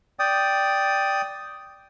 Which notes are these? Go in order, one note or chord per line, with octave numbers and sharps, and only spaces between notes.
D5 G5 D#6